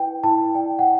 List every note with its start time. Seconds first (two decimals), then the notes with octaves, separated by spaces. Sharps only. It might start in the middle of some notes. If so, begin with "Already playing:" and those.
Already playing: E4 B4 G5
0.24 E4 A5
0.54 D5 G5
0.79 F#5